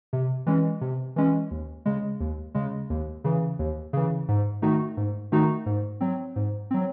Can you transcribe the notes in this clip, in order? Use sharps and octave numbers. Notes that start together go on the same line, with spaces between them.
C3
E3 G#3 C#4
C3
E3 G#3 C#4
D#2
C#3 G#3
D#2
C#3 G#3
D#2
C#3 E3
D#2
C#3 E3
G#2
D#3 A3 D#4 F#4
G#2
D#3 A3 D#4 F#4
G#2
F#3 C4
G#2
F#3 C4